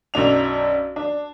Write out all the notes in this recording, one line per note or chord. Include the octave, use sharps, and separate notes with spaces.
B1 F#2 D4 F7
D4